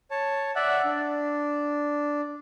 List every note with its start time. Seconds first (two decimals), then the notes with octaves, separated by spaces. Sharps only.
0.11 C#5 A5
0.56 D5 E5 F#5
0.85 D4